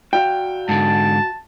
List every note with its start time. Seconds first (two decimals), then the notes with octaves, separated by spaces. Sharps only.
0.13 F#4 D5 F5 G5
0.69 G#2 D3 A5